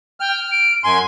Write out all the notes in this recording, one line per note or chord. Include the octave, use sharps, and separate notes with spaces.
G5 F6
D7
F#2 G#5 C6